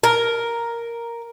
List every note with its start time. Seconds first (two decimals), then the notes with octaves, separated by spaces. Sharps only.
0.03 A#4